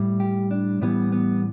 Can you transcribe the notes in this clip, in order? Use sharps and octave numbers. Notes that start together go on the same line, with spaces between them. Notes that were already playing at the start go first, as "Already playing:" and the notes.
Already playing: A2 G3
G4
D4
A2 E3 G3 B3
B3